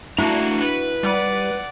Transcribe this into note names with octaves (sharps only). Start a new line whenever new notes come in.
A3 D4 E4 F#4 F5 A#5
B4
G3 D5 F#5